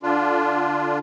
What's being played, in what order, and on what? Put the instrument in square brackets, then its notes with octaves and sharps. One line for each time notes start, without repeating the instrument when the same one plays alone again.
[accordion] D3 D4 F4